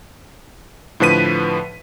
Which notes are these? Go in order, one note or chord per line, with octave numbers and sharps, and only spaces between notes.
A2 D3 F3 B4 B6 D#7